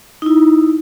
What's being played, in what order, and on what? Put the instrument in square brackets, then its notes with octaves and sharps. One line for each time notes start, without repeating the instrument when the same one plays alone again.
[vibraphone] D#4 E4